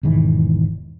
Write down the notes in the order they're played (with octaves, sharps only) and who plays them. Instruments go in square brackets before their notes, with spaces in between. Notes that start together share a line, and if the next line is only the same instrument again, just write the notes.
[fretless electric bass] E1 G#2 D#3 E3